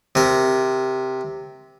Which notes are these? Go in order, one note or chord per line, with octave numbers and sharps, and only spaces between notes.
C3 A#4